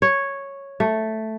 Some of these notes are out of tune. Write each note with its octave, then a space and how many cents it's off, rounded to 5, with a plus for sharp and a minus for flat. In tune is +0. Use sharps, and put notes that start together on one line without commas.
C#5 -5
A3 +0